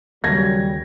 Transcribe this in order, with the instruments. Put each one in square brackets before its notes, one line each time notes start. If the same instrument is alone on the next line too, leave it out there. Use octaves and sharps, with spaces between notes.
[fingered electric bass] D#2 C#3 [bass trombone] F#3 [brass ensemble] G3 [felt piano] G#6 A#6